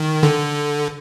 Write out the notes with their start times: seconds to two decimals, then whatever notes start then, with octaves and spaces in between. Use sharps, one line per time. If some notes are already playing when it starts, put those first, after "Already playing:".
Already playing: D#3
0.23 D3